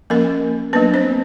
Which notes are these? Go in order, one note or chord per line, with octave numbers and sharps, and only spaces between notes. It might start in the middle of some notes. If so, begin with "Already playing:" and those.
F3 A#3 C#4 A#4
F#3 A#3 B3 D4 B4
C4 C5